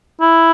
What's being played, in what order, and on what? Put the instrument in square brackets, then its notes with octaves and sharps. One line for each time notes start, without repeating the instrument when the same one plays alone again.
[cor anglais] E4